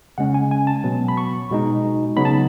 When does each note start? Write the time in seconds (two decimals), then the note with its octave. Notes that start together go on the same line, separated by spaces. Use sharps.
0.18 C#3 G#3 C#4 F#5
0.34 G#5
0.51 G#5
0.67 A5
0.84 B2 F#3 B3
1.08 B5
1.17 C#6
1.51 B2 G#3 D#4
2.17 C#3 F#3 B3 D#4 B5
2.25 A5